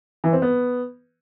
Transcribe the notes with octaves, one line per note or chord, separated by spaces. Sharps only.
E3
C4
B3